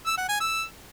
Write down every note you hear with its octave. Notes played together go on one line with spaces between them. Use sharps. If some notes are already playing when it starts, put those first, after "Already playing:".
E6
F#5
G#5
E6